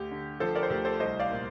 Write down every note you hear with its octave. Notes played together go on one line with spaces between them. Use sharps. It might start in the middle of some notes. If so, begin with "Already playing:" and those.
Already playing: D2 G4
D3
F3 A4 C5
A#4 D5
C5
D2 G4 A#4
A4 C5
C2 C5 D#5
D5 F5
A#2